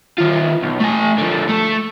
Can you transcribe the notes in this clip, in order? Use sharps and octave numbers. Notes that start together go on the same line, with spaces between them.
D#3 F4
B1
A3 G#5
D3 F3
A3 A4